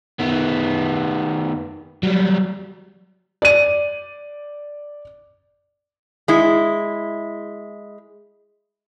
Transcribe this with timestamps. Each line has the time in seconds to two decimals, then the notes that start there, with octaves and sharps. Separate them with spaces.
0.19 D#3 B3
2.03 F#3 G3
3.42 D5 D#7
6.28 G#3 E4